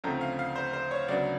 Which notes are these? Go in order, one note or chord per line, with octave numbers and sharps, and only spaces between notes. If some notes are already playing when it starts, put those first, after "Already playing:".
D2 C#3 F3 A3 C4 A#5
F5
F5
C5
C5
C#5
D2 C#3 F#3 B3 D5